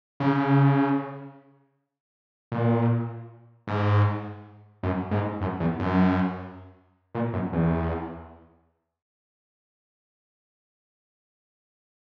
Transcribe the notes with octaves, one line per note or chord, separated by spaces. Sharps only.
C#3
A#2
G#2
F#2
G#2
F#2
E2
F#2
A#2
F#2
E2